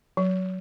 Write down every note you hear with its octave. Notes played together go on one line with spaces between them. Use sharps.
F#3